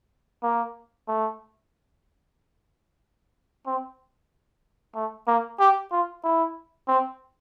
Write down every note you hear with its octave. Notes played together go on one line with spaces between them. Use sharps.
A#3
A3
C4
A3
A#3
G4
F4
E4
C4